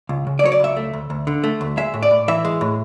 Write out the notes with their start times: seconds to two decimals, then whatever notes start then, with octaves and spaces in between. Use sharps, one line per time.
0.09 C#2
0.27 C#3
0.39 D5
0.43 F#3 C#5
0.52 D5
0.60 C#2 E5
0.77 A3
0.93 D2
1.10 D2
1.27 D3
1.44 A3
1.61 D2
1.77 G#3 E5
1.94 A2
2.03 D5
2.11 A2
2.28 E3 E5
2.45 G#3
2.61 A2